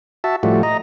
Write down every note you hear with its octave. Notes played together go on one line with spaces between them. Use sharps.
F#4 E5 A5
A2 F3 G3 A3 F#4
D#5 A#5